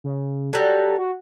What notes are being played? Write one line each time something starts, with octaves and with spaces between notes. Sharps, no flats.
C#3
F#3 G3 A4
F#4